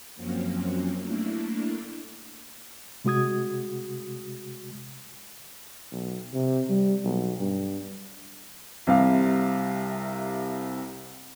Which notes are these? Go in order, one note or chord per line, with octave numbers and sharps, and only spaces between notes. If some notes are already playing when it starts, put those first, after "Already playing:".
F#2 F3 F#3 A#3 C4 C#4
A3 A#3 D4 E4
C3 G#3 F#4 D#6 G#6
B1
C3
G3
B1
G2
C2 C3 G3 F5